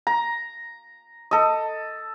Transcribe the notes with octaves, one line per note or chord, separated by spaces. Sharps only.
A#5
A4 D#5